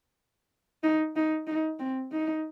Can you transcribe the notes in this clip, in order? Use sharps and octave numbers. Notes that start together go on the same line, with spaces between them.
D#4
D#4
D#4
C4
D#4